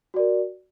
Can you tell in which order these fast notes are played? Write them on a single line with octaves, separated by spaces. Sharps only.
F#4 D5 A#4